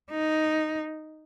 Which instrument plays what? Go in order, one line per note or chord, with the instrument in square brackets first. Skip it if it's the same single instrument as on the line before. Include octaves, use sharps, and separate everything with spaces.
[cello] D#4